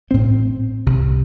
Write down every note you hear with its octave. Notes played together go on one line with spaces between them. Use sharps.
A1 A2 C4
C2 C3